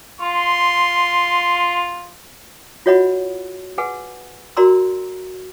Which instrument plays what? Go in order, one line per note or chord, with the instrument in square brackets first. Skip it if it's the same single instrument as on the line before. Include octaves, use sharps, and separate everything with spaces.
[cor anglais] F4 [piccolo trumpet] C6
[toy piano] F4 F#4 C#5 D#5 F#5 B5
G#4 B4 F#5 G#5
F#4 A#4 D5 A#5 C6 E6